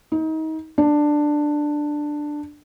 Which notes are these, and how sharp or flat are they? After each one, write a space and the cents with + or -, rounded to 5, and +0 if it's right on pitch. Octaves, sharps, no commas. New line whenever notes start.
D#4 +30
D4 +10